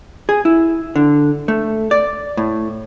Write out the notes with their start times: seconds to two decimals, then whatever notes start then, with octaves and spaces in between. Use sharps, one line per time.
0.29 G#4
0.45 E4
0.96 D3
1.48 A3
1.91 D5
2.37 A2